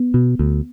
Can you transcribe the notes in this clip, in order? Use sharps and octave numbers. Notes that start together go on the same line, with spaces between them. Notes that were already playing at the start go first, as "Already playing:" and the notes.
Already playing: B3
B2
D2